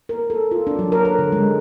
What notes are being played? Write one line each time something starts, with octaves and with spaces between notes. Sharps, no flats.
A#4
A4
F4
D4
F#3
A#4
B4
D3
G#3